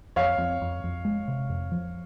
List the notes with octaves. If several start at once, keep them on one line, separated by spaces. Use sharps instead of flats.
F2 C#5 F5
F2
F2
F2
G#3
C3
F2
F3